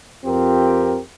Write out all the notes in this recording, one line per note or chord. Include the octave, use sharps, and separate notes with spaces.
F2 C4 F4 G4 A#4